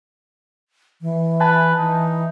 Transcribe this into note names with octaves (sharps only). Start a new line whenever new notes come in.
E3
B4 G#5 A5
E3 D#4